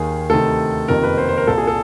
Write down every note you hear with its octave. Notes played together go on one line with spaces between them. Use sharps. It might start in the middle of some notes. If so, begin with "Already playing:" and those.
Already playing: D#2 D#3 G#4
D2 C3 D#3 A4
F#1 F2 C3 D#3 A#4
B4
C5
C5
A#4
C2 A#2 A4
G#4
A4